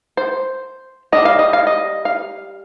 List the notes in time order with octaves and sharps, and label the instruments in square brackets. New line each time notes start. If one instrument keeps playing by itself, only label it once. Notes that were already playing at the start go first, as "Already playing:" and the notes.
[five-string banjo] C5
G3 D4 D#5
F5
D#5
F5
D#5
F5